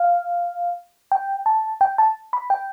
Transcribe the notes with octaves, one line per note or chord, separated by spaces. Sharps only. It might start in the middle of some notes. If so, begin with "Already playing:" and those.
Already playing: F5
G5
A5
G5
A5
B5
G5